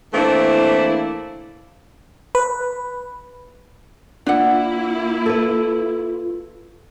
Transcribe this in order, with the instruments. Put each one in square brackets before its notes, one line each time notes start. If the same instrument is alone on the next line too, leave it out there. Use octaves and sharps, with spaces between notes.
[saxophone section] E3 A3 A#3 C4 D4 E4
[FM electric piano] B4
[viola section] A#3 E4 [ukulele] D4 F#5 [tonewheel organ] F4
[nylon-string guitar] A4 B4